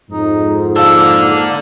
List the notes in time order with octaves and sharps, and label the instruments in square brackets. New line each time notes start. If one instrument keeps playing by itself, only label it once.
[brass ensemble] F2 G#2 [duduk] D#4
[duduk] A#3 [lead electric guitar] D4 A4 [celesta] F5 E6